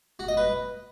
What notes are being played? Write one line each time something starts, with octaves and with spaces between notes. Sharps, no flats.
F#4
D#5
B4